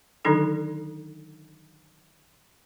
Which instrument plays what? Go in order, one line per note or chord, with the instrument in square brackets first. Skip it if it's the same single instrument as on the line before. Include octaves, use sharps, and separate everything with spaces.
[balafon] D3 D#3 F#3 D4 D#4 A4